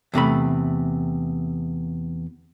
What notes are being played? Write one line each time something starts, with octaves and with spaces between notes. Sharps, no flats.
E2 C3 A3 B5